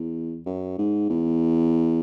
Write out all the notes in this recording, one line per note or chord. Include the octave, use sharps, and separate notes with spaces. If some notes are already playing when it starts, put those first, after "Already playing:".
Already playing: E2
F#2
G#2
E2